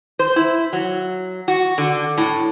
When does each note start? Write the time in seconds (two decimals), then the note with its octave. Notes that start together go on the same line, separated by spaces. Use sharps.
0.19 C5
0.36 E4
0.73 F#3
1.48 F#4
1.78 D3
2.18 A2